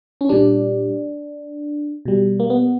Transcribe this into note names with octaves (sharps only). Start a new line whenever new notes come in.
C#4
A#2 G3 D4
B2 G3
A#3
B3